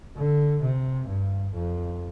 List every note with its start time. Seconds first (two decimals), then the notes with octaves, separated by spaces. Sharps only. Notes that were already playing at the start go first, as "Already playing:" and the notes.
0.17 D3
0.62 C3
1.09 G2
1.54 F2